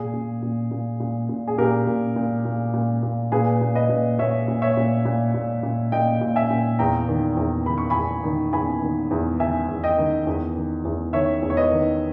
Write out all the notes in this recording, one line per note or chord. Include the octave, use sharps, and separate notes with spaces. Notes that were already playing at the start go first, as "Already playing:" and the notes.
Already playing: A#2 G#4
A#2
A#2
A#2
A#2
A#2
G#4
A#2 G4 A#4
A#2
A#2
A#2
A#2
A#2
A#2 G#4 B4
A#2
B4 D#5
A#2
A#2 C#5 E5
A#2
C#5 E5
A#2
A#2
A#2
A#2
A#2 D#5 G5
A#2
E5 G#5
A#2
E2 G5 A#5
D#3
E2
D#3 B5
C#6
G#5 B5
E2
D#3
E2 G#5 B5
D#3
E2
D#3 E5 G#5
E2
D#5 G5
D#3
E2
D#3
E2
D#3 C#5 E5
E2
C#5
B4 D#5
D#3